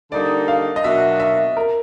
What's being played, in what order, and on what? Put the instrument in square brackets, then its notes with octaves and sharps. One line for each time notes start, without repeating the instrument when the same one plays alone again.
[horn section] D3 G3 A#3 D#4 [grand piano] D5
[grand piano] F5
D#5
[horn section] B2 F#3 A#3 D4 F#4 [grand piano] E5
[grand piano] E5
A#4